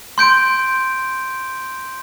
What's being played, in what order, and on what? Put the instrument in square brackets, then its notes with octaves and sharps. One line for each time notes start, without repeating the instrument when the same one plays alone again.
[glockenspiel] C6 G6 D7